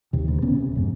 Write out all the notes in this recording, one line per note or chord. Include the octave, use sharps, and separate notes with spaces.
D#2 C3
D2
E1 B3 C#4
C3
F2 G#2